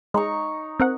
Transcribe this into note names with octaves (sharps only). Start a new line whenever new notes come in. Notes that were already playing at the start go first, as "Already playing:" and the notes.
G#3 D#4 A#5 C#6
C4 A#4 F#5